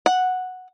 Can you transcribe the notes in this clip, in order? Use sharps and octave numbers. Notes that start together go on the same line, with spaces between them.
F#5